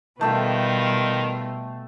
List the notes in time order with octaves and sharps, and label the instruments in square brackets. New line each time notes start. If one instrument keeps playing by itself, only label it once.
[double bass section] B2 [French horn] D#3 [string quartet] G3 F4 B4 [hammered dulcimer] A3 E5 G5